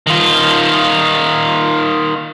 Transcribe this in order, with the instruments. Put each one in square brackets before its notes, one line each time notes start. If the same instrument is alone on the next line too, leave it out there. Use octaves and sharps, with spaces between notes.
[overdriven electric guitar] D#3 F4